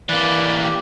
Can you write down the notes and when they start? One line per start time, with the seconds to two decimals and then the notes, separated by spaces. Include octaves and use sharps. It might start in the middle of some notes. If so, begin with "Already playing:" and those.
0.09 E3 A#3 B4 D5
0.63 G4